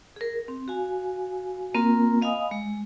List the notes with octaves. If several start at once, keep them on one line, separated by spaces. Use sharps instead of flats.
G#4 A#4
C4
F#4 F5 G#5
A#3 C4 F4 A#4
D#5 F5 G#5 B5 D#6
G#3